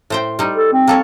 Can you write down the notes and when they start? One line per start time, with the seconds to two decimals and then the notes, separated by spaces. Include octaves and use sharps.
0.10 A2 C5 G5
0.39 G3 D#4
0.56 A4
0.73 C4
0.87 A#3 A4 C#5